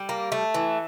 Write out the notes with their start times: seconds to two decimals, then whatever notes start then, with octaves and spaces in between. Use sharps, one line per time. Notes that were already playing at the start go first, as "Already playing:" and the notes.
Already playing: G3
0.09 A#3
0.32 A3
0.54 E3